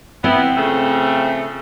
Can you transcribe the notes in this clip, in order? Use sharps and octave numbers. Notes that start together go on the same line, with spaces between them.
B3 C4 E4
C#3 F3 A3